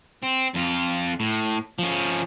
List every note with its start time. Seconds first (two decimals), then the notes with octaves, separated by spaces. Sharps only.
0.23 C4
0.54 F2 F4
1.20 A2
1.79 F3 C#4